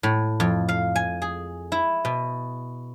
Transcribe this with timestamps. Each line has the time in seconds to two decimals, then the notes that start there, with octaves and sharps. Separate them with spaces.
0.03 A2
0.40 F2
0.69 F5
0.96 G#5
1.22 G#4
1.72 E4
2.05 B2